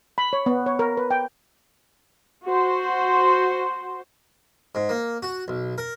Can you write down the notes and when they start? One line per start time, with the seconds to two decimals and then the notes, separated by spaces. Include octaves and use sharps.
0.18 B5
0.33 C#5
0.46 B3
0.66 C#5
0.79 A#4
0.97 B4
1.11 G5
2.46 F#4 C5
4.75 G#2
4.89 A#3
5.23 F#4
5.48 B1
5.78 A#4